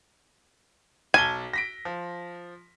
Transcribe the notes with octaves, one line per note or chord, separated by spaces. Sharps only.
B1 G#5 A5 G7
A#6 B6 D7
F3